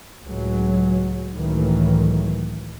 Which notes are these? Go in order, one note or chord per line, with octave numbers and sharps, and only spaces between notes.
C#2 A2 F#3 G#3
C#2 A2 D#3 E3 F#3 A3